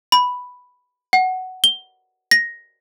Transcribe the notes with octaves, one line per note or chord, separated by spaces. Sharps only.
B5
F#5
G7
A#6